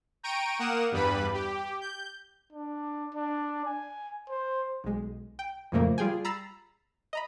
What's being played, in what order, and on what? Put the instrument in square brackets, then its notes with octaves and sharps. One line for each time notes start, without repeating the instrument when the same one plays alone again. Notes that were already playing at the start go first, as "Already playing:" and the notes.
[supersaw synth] G5 A#5 C#6 D7 D#7
A#3 A#4 F#5 D#6 E7
E2 G2 G3 B4 B5
G4
G6
[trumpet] D4
D4
G#5
C5
[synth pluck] B1 G#3
G5
F2 A#2 C#3 F3 A3 A#3
G3 F4 G#4 G5 G#5
A#5 B5 E6 A6 C7
D#5 A#5 B5